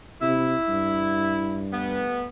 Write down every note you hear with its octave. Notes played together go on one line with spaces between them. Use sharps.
C3 E4
G2
G3 A3 B3